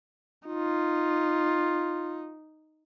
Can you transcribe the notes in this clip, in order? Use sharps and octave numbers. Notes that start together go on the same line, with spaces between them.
D#4 F4